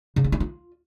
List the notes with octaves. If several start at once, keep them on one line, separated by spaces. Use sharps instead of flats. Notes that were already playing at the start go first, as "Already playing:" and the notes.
C#3
D4
E4
F4